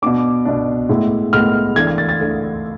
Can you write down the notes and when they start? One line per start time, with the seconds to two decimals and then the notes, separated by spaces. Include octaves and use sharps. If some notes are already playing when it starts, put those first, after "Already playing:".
0.02 B2 B3 D4 D6
0.45 B2 B3 D4
0.89 A2 G#3 B3 E4
1.33 A2 G#3 B3 E4 F6
1.76 E3 A3 D4 G#6
1.87 G#6
1.98 A6
2.09 A6
2.20 E3 A3 D4